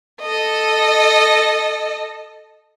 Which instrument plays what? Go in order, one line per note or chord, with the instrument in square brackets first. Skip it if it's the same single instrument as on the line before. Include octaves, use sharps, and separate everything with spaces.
[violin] A4 D#5